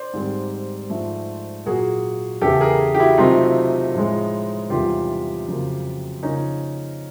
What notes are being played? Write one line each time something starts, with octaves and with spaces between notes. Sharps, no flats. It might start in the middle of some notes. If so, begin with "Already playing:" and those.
Already playing: C5 D5
G#2 D#3 G3 C4
G#2 F3 A3
A#2 F#3 A#3 F#4 G#4
E2 C#3 E3 G4 A4
G#4 A#4
G4
E4 F#4
C3 D#3 F#3 A3 C4 D#4 F4
A2 F3 G#3
E2 C3 D#3 G3 F4 G4
F2 C#3 F#3 A#3
C#3 F3 A#3 C#4 D#4